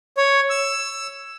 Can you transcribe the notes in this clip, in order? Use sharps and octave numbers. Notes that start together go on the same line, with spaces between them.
C#5
E6